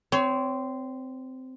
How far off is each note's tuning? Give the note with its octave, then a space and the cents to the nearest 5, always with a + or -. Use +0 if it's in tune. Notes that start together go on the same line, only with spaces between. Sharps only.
C4 -15 C#5 +20